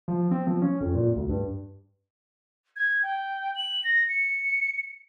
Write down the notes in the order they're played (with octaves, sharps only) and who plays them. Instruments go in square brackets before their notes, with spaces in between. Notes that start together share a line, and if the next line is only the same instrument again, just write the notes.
[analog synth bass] F3
C4
F3
C#4
F2
A#2
D2
G2
[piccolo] G#6
G5
F#7
A#6
C#7